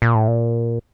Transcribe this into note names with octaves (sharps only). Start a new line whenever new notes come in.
A#2
A2
A#2